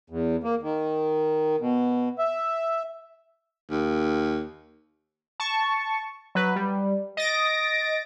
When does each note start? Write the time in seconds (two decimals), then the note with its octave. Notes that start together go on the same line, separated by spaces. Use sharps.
0.10 E2
0.43 A#3
0.62 D#3
1.60 B2
2.18 E5
3.70 D#2
5.40 A5 C#6
6.35 F#3 B4
6.56 G3
7.17 D#5 A6 A#6 D7